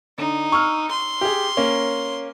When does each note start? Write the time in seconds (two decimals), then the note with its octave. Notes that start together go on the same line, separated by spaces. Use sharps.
0.18 D3 D#4
0.52 C#6 E6 F6
0.91 C6
1.21 G4 G#4
1.57 A#3 C#4